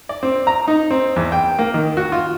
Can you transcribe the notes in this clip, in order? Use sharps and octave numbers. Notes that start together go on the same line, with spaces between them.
D5
C4
A#5
D#4
C4
E2
G5
A#3
D#3
F#4
F4